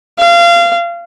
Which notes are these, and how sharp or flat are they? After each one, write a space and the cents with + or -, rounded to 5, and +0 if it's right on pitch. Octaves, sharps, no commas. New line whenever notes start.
F5 -25